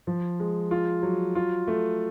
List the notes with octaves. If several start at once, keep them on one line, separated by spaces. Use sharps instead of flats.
F3
G#3
F4
F#3
F4
A3